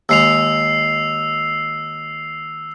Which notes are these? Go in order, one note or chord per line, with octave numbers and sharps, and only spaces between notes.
D#2 G#3 E6 C7 F7